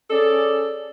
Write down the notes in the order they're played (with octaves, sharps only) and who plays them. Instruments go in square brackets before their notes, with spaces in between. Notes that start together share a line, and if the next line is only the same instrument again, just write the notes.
[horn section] C#4 G#4 A4 D5